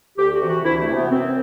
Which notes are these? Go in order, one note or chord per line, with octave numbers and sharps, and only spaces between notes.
D2 G4
F#4
C3 E3
F#4
D2 E4
A3
C3 E3
B3
F#2 C4